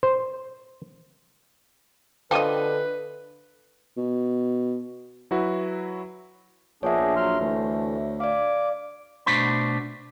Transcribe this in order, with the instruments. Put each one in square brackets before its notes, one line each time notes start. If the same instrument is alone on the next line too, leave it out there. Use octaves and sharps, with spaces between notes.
[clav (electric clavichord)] C5
[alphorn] D3 [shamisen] F3 D#5 [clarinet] B4 [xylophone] G5 D6 D#7
[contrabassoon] B2
[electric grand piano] F#3 E4 F#4 B4
[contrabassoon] A#1 [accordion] B3 D4 G#4 [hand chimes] C#5 E5
[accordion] F#3 C6 F6
[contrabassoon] D2 [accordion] E3 A3
[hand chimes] D5 F5 [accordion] D6
[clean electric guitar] B2 A3 D4 F#4 C5 B5